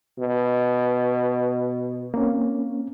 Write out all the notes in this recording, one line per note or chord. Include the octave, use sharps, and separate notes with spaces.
B2
A#3 C4 C#4